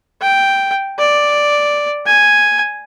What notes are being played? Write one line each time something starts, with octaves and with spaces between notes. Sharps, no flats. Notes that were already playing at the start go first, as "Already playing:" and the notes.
G5
D5
G#5